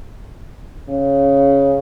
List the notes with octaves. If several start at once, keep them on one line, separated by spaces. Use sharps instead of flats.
C#3